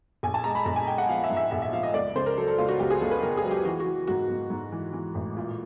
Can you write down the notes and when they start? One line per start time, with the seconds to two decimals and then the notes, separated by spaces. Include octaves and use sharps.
0.23 A#1 G#5
0.34 A5
0.44 G#3 A#5
0.55 B5
0.66 A#1 A#5
0.76 G#5
0.87 G#3 G5
0.98 F#5
1.09 F3 F5
1.24 E5
1.30 G#2
1.37 E5
1.51 A#1 E5
1.62 E5
1.73 F3 F5
1.83 D#5
1.94 C#2 D5
2.16 C#3 C5
2.26 A#4
2.37 F#3 A4
2.48 A4
2.58 C#2 F4
2.69 F#4
2.79 C#2 G4
2.90 G#4
3.01 C#2 A4
3.11 B4
3.23 C#2 A#4
3.37 G#4
3.45 F#3
3.51 G4
3.65 E3 F#4
3.80 F#4
3.87 E3
4.07 G#2 F#4
4.30 G#2
4.50 G#2
4.72 E3
4.93 E3
5.15 A1
5.37 A#2